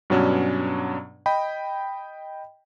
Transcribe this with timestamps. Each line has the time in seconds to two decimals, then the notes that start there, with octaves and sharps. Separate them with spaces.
0.10 G2 B2 F#3 C#4 D4
1.26 D#5 G5 B5